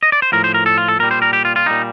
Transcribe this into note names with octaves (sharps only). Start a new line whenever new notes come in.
D#5
D5
C5
A2 F3 A#4
C5
A#4
A4
F4
A4
A#2 G3 A#4
C5
A#4
G4
F4
F4
A#2 G3 D#4